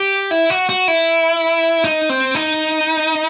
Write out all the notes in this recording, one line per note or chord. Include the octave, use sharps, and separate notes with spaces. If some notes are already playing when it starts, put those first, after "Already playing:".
Already playing: G4
E4
F#4
F#4
E4
D#4
C4
D#4